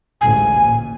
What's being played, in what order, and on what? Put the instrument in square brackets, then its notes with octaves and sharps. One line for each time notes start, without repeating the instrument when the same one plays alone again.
[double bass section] A1 D2 G#2 [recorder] G#5
[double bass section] A#2